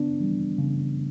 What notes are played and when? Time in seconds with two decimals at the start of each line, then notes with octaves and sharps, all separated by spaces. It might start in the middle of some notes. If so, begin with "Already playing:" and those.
Already playing: C#3 B3 D4
0.20 E3 G3
0.58 C#3